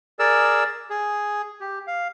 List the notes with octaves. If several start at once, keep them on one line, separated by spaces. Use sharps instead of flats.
G#4 A#4 D5 E6
G#4
G4
F5